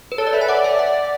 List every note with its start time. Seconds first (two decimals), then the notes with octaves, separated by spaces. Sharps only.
0.12 B4
0.18 A4 C#5
0.27 D5
0.33 B4 E5
0.41 G#5
0.48 D5 F#5
0.64 E5
0.79 F#5